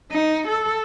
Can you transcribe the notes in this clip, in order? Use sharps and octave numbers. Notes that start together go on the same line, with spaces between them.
D#4
A4